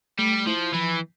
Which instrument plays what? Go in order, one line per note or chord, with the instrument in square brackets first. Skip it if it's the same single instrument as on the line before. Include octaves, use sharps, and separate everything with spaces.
[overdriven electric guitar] G3 [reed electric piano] A3
[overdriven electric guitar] F3 [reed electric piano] E4
[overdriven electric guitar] E3 [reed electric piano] F3